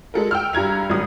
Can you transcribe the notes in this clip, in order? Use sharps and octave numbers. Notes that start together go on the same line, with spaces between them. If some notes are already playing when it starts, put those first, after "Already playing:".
G#3 A4 A#4
G5 E6 F6
G2 A#5 G#6 F7
G#1 G2 F#3 D#6